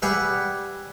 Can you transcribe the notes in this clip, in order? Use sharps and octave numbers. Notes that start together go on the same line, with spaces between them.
G3 G4 G#4 B4 E5 F#5